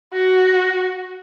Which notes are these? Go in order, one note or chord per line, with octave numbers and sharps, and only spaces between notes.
F#4